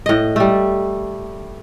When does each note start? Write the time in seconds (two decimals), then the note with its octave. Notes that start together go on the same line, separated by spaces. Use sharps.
0.06 A2 D#5
0.36 G3 A3